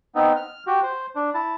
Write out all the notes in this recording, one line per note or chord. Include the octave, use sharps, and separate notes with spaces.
B3 C4 D#4
F6
F#4 G4
C5
D4
E4 A5